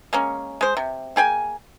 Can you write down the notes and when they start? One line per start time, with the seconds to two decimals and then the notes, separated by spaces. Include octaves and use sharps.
0.13 G#3 A#3 C#4
0.61 G#3 C5
0.77 C3
1.16 A#3 G#4 G5 G#5